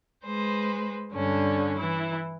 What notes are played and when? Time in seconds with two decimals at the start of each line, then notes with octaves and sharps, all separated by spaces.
0.25 G#3 B4 C5
1.14 G2 D3 C#4 D4
1.78 E3 E4